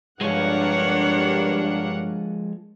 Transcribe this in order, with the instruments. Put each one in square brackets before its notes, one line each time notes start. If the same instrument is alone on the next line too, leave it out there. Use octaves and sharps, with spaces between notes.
[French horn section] G2 [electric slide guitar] F3 G#3 [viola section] D4 A#4 F#5 [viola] C#5